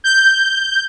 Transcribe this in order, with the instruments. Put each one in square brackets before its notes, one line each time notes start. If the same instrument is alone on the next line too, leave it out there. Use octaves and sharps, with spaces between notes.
[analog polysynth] G6